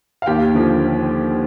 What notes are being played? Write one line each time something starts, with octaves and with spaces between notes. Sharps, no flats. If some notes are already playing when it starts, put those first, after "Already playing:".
F5
D#2 G4 G5
D3 F3